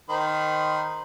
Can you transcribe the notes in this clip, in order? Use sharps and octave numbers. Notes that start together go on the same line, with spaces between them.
D#3 C5 B5